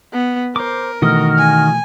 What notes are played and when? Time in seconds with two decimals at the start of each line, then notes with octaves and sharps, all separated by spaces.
0.13 B3
0.56 A#4 C5 D6
1.02 B2 D#3 E3 A3 F#4 D#5 F6
1.37 G#5